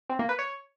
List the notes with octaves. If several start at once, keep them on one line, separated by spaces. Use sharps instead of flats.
C4
A#3
B4
C#5